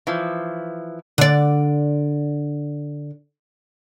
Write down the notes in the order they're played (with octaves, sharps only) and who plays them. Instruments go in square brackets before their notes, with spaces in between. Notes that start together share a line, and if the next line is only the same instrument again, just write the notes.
[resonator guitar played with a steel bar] E3 F3
[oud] D3 D5